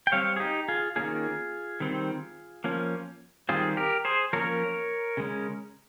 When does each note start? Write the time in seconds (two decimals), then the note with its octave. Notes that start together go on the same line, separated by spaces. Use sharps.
0.07 G5
0.12 G3 C4 C#5 F5
0.36 G#4
0.40 D#4 G4
0.68 F4 G#4
0.96 D#3 G3 A#3 C#4 F4 G#4
1.80 D#3 G3 C4
2.64 F3 A#3 C#4
3.49 D#3 G3 C4 F4 G#4
3.77 G4 A#4
4.05 G#4 C5
4.33 F3 A#3 C#4 A#4 C#5
5.17 C#3 G#3 C#4